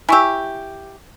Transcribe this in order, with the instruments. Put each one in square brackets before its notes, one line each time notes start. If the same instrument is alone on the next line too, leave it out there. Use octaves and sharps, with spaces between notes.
[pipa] E4 G4 [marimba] G#5 C#6 E6